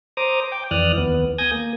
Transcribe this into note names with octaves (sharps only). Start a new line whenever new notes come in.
C5 A#5 D6 D#6
G5 D6
F2 E3 D5 D#6 F6 F#6
D#2 B3
G#5 D#6 G6 G#6 A#6
A#3